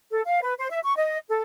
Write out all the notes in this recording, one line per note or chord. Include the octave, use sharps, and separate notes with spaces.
A4
F5
B4
C5
E5
C#6
D#5
A4